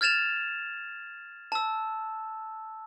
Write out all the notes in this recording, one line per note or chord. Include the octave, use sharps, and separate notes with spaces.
F6 G#6 A6 E7 F7
A5 E6